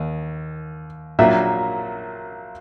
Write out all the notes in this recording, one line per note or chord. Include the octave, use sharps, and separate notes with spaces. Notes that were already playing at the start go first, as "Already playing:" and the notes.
Already playing: D#2
A#1 A#2 F#3 A#3 E5